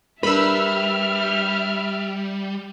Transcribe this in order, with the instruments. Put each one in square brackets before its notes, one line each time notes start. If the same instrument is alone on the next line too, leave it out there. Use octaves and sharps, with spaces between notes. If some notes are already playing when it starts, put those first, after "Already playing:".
[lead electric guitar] G3 [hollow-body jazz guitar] D4 A#4 B4 [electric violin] E5 F6 [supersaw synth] B5 E6